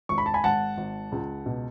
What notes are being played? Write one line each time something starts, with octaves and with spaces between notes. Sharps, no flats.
G#1 C#6
B5
A5
G#5 B5
G#1 F#5 A5
G#1
C#2
B2